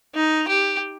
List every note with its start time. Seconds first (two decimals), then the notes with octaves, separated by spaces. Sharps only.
0.15 D#4
0.48 G4